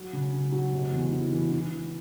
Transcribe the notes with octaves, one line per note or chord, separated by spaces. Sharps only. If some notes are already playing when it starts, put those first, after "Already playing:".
Already playing: F#3
C#3
C#3
F#3
F1
E2
E3
E3
E3
E3